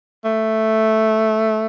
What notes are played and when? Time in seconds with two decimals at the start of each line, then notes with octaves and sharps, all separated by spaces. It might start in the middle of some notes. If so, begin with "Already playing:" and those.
0.25 A3